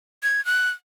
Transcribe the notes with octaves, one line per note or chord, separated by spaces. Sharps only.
G#6
F#6